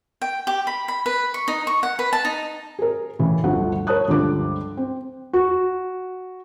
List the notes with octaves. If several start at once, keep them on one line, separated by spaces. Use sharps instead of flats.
G5
G4
B5
B5
B4
C#6
D#4
C#6
F#5
B4
A5
D#4
G#4 A#4
A2 C#3 E3
G1 D2 F3 A3 F#5
A#4 C#5 A5 D#6 F#6
C#2 G2 D3 F3 D6
C4
F#4